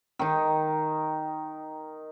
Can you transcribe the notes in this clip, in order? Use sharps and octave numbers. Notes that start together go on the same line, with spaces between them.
D#3 D#4